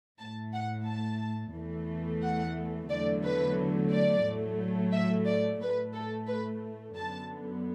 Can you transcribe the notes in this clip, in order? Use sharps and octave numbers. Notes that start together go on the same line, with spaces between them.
A2 A3 A5
F#5
A5
E2 E3 A3
F#5
E2 D3 F#3 A3 D5
B4
D5
A2 F#3 A3
E5
D5
A2 A3 B4
A4
B4
F#2 D3 B3 A5